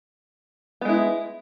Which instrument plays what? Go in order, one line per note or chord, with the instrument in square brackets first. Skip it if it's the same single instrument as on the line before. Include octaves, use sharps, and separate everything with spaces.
[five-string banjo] B3
G#3
E4